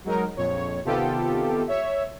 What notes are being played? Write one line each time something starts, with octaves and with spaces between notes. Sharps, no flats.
F#3 G#3 D#4 A#4
A#1 F2 C#5
C3 D#3 B3 F4 G4 A4
C#5 E5